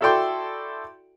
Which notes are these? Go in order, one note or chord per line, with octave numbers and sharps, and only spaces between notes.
E4 F#4 A4 D5 G5 C6